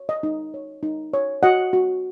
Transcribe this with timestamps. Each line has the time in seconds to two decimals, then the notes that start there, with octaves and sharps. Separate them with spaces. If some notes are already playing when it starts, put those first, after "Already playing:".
Already playing: C#5
0.09 D#5
0.23 D#4
0.54 C#5
0.83 D#4
1.13 C#5
1.43 F#4 D#5 F#5
1.73 F#4